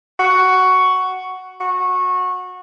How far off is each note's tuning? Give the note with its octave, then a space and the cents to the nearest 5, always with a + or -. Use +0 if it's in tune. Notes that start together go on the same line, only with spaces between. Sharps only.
F#4 +5
F#4 -20